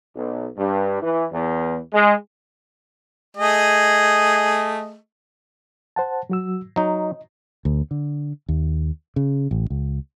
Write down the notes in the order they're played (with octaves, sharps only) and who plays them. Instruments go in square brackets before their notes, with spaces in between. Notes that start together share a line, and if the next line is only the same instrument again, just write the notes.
[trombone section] B1
G2
E3
E2
G#3
[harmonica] A3 G#4 D#5
[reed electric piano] C5 F#5 A5
F#3 F#4 E6
[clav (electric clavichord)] F#3 D#4 [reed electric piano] D#5
[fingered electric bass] D2
D3
D#2
C#3
A1
C#2